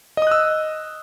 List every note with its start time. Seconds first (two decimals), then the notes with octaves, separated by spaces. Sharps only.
0.17 D#5
0.22 D#6
0.27 F#6
0.31 E6